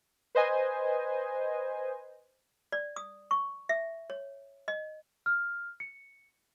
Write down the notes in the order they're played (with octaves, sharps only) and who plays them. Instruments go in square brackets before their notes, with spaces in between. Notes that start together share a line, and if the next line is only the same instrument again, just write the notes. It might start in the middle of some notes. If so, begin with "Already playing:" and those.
[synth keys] B4 C5 D#5 G#5
[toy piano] D5
D#6
C#6
E5
C#5
D#5
[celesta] F6
C#7